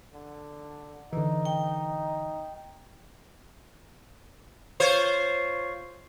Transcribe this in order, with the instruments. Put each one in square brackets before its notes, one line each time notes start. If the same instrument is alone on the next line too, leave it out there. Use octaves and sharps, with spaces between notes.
[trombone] D3
[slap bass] D3 E3 [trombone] D#4
[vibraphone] G5
[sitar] F4 C5 C#5